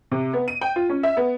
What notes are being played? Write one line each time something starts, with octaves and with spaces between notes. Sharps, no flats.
C3
B3
D#7
G5
F4
C#4
E5
B3